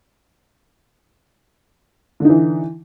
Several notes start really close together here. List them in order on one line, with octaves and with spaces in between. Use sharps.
D3 D#4 E3